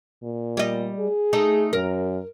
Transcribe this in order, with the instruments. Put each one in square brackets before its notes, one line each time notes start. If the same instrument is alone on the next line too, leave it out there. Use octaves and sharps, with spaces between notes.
[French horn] A#2
[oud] G3 D#5
[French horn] G#4
[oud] A3 D#4
[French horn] F#2 [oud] A#4